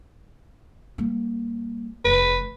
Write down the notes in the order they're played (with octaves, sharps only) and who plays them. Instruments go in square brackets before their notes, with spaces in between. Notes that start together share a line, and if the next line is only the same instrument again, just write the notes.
[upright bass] G3 A#3
[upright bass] F1 F2 [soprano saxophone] B4